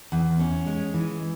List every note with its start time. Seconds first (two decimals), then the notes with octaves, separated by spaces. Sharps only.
0.12 E2
0.39 C#4
0.67 G#3
0.94 E3